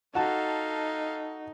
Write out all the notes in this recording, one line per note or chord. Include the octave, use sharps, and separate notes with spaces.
D#4 F#4 A4 F5 A5